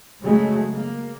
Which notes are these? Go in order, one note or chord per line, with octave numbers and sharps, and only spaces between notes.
C#3 F#3 G#3 A3
A#3